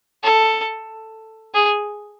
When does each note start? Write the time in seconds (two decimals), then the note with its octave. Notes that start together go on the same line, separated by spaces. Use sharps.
0.23 A4
1.54 G#4